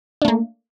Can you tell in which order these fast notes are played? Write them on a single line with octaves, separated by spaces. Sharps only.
D4 A3 A#3